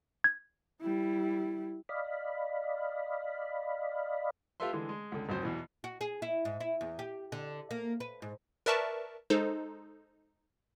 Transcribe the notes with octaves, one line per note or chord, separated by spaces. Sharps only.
G#6
G3 E4
D5 D#5 F5 B5
F4 G4 A4 B4 E5 C6
D3 E3 G#3
G#3
C#2 D3
G#1 C#2 F#3 C5
E2 B2 E3
F#4
G#4
E4
G#2
E4
E2
G4
D3
A#3
B4
G#2
A#4 B4 D5 E5 A5 C#6
G#3 D#4 A4 C5